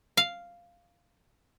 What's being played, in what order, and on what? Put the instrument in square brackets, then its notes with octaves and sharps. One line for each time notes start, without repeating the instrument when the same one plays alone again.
[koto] F5